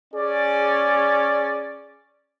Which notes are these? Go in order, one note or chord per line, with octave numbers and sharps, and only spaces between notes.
C#4 G#4 D5